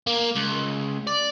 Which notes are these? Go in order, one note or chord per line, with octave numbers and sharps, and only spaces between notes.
A#3
C#2
D5